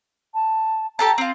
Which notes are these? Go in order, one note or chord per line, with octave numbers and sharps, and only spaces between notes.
A5
G4 A4 A5 A#5
C4 F4